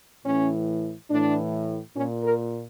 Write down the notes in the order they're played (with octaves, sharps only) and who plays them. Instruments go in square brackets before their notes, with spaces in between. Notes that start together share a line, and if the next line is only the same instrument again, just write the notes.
[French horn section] A2 E3 C#4
A2 E3 D4
A#2 C#4
A#4